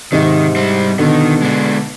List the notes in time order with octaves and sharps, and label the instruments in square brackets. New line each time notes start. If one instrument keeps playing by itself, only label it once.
[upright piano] G#2 C3 [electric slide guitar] D#3
[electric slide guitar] G3 C4
[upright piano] B2 D3 [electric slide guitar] D#3
[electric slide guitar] G#3 D4